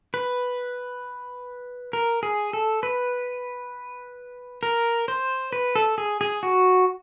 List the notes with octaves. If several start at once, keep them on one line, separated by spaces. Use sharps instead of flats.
B4
A#4
G#4
A4
B4
A#4
C5
B4
A4
G#4
G#4
F#4